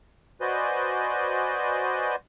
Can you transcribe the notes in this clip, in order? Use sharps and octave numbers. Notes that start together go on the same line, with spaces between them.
F#4 B4 C5 D5 D#5 G#5